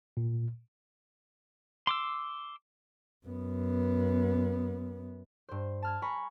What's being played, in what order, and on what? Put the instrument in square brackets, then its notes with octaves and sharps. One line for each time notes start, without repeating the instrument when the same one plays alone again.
[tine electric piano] A#2
[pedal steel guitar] C6 D6 E6
[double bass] F#2 B3
[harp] G2 C5
A5 F6 G#6
G#5 A#5 B5 C#6